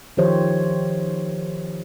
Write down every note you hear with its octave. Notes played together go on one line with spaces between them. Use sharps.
D#3 F3 G4 C5 C#5 E5